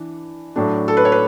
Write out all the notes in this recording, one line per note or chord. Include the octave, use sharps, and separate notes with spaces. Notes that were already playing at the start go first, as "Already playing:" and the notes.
Already playing: E3 D4
A2 F#3 A3 D4
A4
B4
C#5
B4